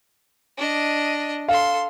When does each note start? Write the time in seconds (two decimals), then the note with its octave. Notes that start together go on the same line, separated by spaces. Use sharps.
0.57 D4 D#5
1.48 A4 F5 C6